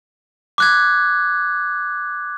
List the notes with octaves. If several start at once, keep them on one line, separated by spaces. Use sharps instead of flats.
D6 F#6 G#6